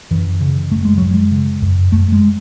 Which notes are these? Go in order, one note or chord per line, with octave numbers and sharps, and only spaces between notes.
F#2 E3
C#3
F#2 A3
G#3
F#2 F#3
G#3
C#3
F#2
F#2 A3
G#3